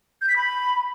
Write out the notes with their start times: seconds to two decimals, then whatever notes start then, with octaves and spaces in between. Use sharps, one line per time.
0.21 G6
0.28 B6
0.36 B5